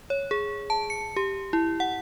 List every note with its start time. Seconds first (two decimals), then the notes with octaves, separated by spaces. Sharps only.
0.10 C#5
0.31 G#4
0.70 A5
0.90 C#7
1.16 G4
1.53 E4
1.80 F#5